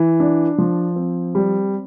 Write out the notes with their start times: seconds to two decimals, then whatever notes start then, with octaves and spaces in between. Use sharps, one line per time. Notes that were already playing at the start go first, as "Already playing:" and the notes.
Already playing: E3
0.20 D4
0.58 F3
0.96 C4
1.35 G3